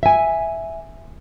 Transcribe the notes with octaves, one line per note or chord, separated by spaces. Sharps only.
E5 G#5